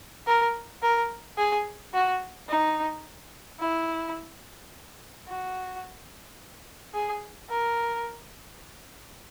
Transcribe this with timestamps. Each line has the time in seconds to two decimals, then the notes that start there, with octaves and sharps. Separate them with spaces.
0.26 A#4
0.82 A#4
1.38 G#4
1.94 F#4
2.49 D#4
3.60 E4
5.27 F#4
6.94 G#4
7.49 A#4